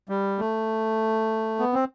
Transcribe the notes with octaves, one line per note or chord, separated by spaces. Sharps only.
G3
A3
B3
C4